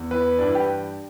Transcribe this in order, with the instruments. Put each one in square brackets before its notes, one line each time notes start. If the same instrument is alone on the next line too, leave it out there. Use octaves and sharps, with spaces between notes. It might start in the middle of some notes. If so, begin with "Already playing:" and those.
Already playing: [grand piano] E2
E3 B4
G2 D4
E4
G4